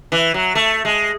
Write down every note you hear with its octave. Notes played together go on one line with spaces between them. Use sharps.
E3
F#3
A3
G#3